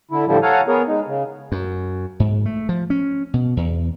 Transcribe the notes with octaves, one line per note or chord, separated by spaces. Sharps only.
D3 E4
A2 D3 F3 G3 E4
A4 C#5 F5 F#5 G#5 A#5
B3 G#4 A#4 C#5
G#3 D#4
C#3
F#2
G#2
A3
F3
C#4
B2
E2